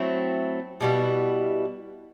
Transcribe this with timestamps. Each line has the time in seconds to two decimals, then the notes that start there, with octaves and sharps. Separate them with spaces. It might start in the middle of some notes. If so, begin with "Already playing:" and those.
Already playing: F#3 A3 C4 E4
0.81 B2 G3 B3 E4